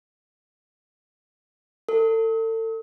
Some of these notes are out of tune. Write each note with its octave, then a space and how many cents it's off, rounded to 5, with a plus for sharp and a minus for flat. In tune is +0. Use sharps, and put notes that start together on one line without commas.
A4 +35